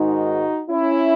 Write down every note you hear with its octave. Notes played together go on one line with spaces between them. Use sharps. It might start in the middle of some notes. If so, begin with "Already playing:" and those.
Already playing: G#2 D#3 G#3 D#4 F#4
C#4 E4